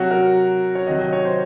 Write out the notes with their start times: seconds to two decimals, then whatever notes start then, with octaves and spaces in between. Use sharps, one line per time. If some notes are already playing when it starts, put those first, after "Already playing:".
Already playing: C3 F#3 F#4
0.11 A#4
0.75 C#5
0.87 C3 D#3 F#3 D#5
1.00 D#5
1.13 C#5
1.25 C5